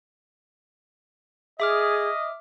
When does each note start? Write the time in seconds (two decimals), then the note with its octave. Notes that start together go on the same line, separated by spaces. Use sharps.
1.60 G#4 D#5 E5 D6 F6